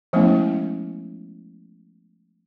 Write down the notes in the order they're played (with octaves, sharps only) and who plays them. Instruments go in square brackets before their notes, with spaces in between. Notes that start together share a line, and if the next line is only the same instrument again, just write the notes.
[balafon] F3 G#3 A3 B3 C#4 E4